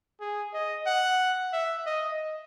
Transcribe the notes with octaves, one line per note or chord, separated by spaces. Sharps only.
G#4
D#5
F#5
E5
D#5